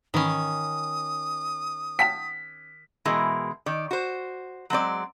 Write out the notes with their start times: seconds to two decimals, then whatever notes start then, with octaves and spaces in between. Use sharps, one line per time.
0.14 G#2 D#3 E3 C#4 B5 D#6
1.99 F#5 G5 A5 B6
3.05 B2 E3 G#3 E4 A#4
3.66 D#3 D5
3.91 F#4 C5
4.70 F#3 G#3 C4 D5